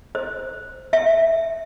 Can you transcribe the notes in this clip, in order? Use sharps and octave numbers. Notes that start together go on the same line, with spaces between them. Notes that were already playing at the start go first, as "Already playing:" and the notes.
C5
E5